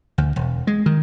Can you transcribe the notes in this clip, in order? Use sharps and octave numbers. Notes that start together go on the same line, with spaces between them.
D2
E1
G#3
D#3